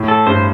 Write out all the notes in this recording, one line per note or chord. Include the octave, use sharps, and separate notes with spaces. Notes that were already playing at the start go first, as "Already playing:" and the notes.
Already playing: A2
A4
G2 C5